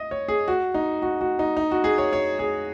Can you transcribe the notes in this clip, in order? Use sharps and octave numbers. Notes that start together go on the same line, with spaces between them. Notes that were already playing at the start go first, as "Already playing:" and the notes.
Already playing: D#5
C#5
G#4
F#4
D#4
F#4
F#4
D#4
D#4
F#4
G#4
C#5
C#5
G#4